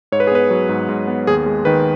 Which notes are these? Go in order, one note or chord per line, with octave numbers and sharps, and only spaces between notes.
G#2 C#5
B4
G#4
B3 B4
F#3
G#2
G#2
B3
D#2 G#4
G#3
D#3 B4